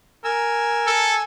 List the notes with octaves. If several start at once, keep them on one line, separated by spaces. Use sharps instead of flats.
A#4 G#5 E6
A4